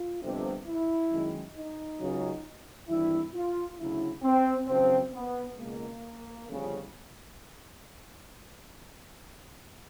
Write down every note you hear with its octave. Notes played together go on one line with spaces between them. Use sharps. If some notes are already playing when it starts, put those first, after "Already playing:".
Already playing: F4
G1 F2 C3
E4
F#2 D#3 G#3
D#4
C#2 C#3 F#3
G#1 G2 E3 G3 E4
F4
D2 C#3 F#3 E4
C4
G#1 F#2 C#3 F3 C4
B3
C#2 B2 G#3 A#3
G1 F2 C#3